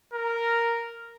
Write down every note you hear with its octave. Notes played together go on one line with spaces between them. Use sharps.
A#4